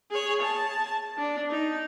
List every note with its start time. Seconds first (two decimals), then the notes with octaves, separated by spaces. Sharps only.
0.11 G#4 C#5
0.42 A5
1.18 D4
1.50 D#4